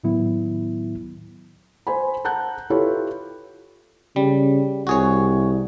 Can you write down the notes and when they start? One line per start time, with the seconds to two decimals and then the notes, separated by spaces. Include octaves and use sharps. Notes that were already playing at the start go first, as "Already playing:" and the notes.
0.04 A2 D#3 F#3 B3 E4
1.87 C5 G#5 B5
2.25 F#5 A5 A#5 F#6 G6
2.70 E4 F4 G4 A4 B4 C#5
4.16 C#3 G3
4.87 C2 F#4 G#4 C#5